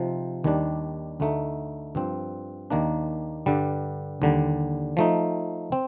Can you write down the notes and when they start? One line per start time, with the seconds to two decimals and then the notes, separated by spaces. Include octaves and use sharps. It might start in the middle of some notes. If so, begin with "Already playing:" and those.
Already playing: C3 F3 C4 D#4
0.44 D#2 D#3 G3 D4
1.20 D2 D3 A3 D#4
1.95 G2 F3 C4
2.70 D#2 D#3 A#3 D4
3.46 G2 D3 G3
4.22 D#2 D3 G3
4.97 F3 A3 D#4
5.72 C4